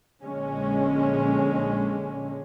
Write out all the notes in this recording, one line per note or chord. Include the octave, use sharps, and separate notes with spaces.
A#1 D3 G#3 C#4